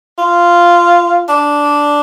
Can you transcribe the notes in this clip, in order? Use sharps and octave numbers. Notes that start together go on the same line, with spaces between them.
F4
D4